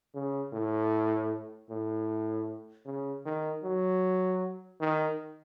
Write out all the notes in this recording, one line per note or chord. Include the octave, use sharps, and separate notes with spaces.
C#3
A2
A2
C#3
D#3
F#3
D#3